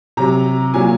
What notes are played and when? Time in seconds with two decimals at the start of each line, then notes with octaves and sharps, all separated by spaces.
0.17 C3 F#3 A#5
0.74 A#2 F#3 G#5